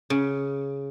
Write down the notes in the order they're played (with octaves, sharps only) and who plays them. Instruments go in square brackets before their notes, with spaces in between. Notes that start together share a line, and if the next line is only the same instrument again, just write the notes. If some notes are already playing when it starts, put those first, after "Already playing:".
[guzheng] C#3